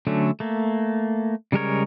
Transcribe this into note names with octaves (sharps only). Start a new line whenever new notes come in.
D3 F#3 A3 C#4 D4
A3 A#3
C#3 G3 G#3 A#4 C#5